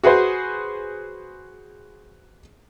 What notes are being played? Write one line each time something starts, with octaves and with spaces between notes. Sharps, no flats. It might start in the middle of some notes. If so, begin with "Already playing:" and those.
F#4 G#4 B4 C5